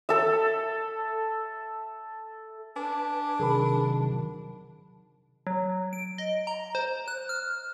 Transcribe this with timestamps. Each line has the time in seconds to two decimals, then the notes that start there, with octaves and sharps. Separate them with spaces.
0.09 A4 E5
2.76 D4 B4 G#5 D6
3.39 C3 D#3 F#3 G#4 A#4 B5
5.47 F#3
5.93 D7
6.18 D#5
6.47 A#5
6.75 C5
7.08 F#6
7.29 F6